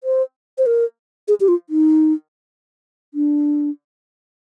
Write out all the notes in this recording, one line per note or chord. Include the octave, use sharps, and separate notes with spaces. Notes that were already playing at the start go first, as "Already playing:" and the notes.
C5
C5
A#4
G#4
G4
F4
D#4
D4